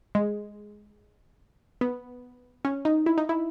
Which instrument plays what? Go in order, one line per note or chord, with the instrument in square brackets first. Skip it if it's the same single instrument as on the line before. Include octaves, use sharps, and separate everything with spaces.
[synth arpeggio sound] G#3
B3
C#4
D#4
E4
D#4
E4